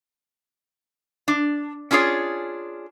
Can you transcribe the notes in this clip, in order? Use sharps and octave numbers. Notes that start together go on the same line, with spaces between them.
D4
C#4 D4 F4 G#4 C#5